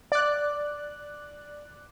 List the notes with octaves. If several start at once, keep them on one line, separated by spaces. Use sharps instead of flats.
D5 F#6